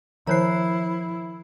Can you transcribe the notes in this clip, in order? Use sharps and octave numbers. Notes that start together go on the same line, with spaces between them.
D#3 F3 E4 C5 C#5 A#5 C7